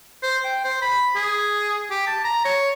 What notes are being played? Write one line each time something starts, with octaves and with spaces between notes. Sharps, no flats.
C5
G5
C5
B5
G#4
G4
A5
A#5
C#5